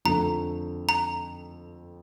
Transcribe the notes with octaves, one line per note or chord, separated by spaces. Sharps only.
F2 D3 F3 A3 A#5
A#5